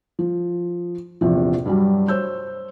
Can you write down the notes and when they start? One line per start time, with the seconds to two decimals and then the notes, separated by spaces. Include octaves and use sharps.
0.19 F3
1.21 A#1 E2 C3 F3
1.66 G2 F#3 G3
2.08 C5 C#5 E6 G6